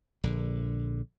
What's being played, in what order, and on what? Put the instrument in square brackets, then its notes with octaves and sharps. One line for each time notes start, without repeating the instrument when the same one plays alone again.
[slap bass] A#1 D3